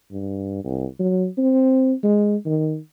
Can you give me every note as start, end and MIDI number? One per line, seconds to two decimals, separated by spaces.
0.11 0.61 43
0.64 0.86 36
1.00 1.27 54
1.38 1.93 60
2.03 2.36 56
2.46 2.78 51